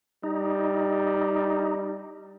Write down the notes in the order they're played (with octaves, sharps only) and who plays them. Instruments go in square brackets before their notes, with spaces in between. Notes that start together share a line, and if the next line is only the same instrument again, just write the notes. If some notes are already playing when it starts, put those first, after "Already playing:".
[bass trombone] G3 [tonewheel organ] D#4